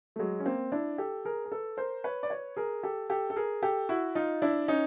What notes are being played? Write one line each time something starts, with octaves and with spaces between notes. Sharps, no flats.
A3
F#3 G#3
C#4
A#3 C4
D4 E4
G4 A4
G#4 A#4
A#4
A4 B4
A#4 C5
B4 C#5
D5
B4 C#5
G#4 A#4
G4 A4
G4 A4
A4
G#4 A#4
G4 A4
E4 F#4
D#4 F4
D4 E4
C#4 D#4